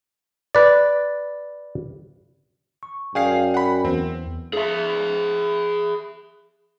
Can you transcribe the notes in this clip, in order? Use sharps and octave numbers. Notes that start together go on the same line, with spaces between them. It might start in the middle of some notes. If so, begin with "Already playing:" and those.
B4 D5
C#6
F#2 G#4 D5 F5 G5 G#5 C7
F#5 B5
E2 C4
G#4 E5